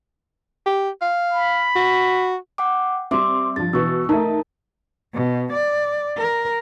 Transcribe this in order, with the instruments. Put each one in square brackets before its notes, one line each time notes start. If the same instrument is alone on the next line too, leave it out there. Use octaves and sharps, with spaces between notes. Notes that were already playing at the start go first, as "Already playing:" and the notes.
[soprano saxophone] G4
F5
[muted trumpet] B5
[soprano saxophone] F#4
[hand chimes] F#5 G5 D6
[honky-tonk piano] G3 C4 [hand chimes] E5 C6 D6
[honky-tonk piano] G2 F3 [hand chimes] A6
[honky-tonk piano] B2 E3 [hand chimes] C#6 E6
[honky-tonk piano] A3 D#4 [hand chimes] A#4 A5
[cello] B2
D5
A#4